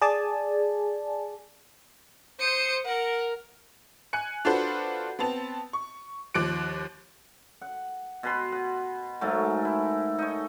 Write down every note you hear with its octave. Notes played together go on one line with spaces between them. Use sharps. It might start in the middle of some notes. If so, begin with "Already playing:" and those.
G#4 D5 G#5 A5
C5 D#6 C#7
A#4 F#5
G#5 F#6 C#7
D4 F4 F#4 A4 B4 C5
B3 C4 A5 F7
C#6
D#2 F3 D6 F#6 D7
F#5
B2 B4 C6
F#5
G#2 F#3 A3 A#4
E4
D#4 C#5